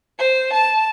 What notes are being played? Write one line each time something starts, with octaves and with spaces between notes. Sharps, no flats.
C5
A5